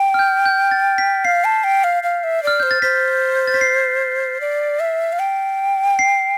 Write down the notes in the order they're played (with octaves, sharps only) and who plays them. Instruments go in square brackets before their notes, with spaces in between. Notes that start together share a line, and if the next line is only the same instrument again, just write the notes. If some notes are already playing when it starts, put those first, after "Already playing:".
Already playing: [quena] G5
[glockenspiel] F6
G6
G6
A6
B6
[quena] F5 [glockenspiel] C7
[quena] A5
G5
F5
F5
E5
[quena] D5 [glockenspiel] F6
[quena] C5 [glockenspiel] G6
[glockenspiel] A6
[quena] C5 [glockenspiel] B6
[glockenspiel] A6
B6
C7
[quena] D5
E5
F5
G5
[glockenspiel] C7